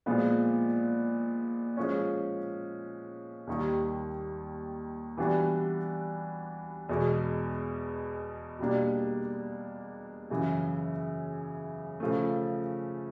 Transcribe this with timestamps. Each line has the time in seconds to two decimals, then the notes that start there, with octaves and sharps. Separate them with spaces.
0.06 A#2 F3 G#3 B3
1.77 F3 G#3 C#4
3.47 D#2 D#3 G3
5.18 E3 G3 B3 D4 F#4
6.89 E2 B2 G#3
8.59 B2 G3 A#3 D4
10.30 F#2 C#3 E3
12.00 C#3 F3 A3